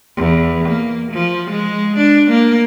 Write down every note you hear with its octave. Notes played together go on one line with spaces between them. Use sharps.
E2
A#3
F3
G#3
D4
A#3